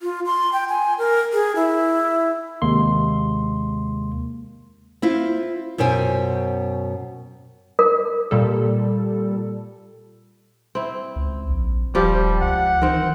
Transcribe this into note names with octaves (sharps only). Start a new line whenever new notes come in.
F4
C6
G5
G#5
A#4
G#4
E4
D#2 C3 G#3 A#3 C6
C4 E4 F4
F#2 B2 C5 G5 G#5
A#4
A#2 G3 A4
C4 E4
C#2
A#1
D#1 F3 G3 G4
C#2 F#5
D#3 E3 C4